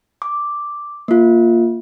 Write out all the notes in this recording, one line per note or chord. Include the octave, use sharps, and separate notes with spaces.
D6
A#3 F4